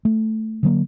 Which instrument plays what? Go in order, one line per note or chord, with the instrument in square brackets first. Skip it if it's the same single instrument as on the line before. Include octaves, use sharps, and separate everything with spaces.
[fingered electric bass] A3
D3 F#3 A#3